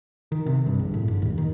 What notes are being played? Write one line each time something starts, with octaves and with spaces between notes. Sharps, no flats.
D#3
C3
G2
A#1
A2
G1
D#2
D#3